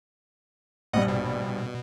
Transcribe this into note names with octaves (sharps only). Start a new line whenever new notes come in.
A#1 G2 G3 D#5 F#5
B2